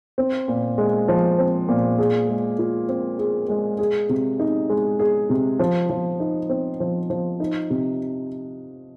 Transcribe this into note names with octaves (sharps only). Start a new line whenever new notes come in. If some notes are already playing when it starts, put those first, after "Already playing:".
C4
A#2
G#3
F3
C4
A#2
G#4
G#3
F4
C4
G#4
G#3
G#4
C3
D#4
G#3
G#4
C3
F3
F3
D#4
C4
F3
F3
D#4
C3